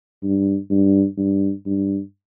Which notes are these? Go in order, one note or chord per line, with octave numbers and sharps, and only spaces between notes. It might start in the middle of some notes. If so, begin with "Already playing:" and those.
G2
G2
G2
G2